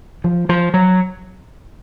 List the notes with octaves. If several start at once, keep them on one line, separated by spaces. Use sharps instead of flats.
F3
F3
F#3